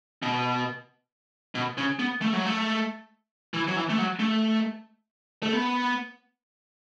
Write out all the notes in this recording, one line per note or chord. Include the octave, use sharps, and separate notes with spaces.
B2
B2
C#3
B3
A3
F#3
A3
E3
F#3
E3
A3
F#3
A3
A3
B3